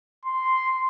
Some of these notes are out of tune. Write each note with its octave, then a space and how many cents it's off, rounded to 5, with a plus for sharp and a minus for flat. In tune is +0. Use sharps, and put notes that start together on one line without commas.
C6 -5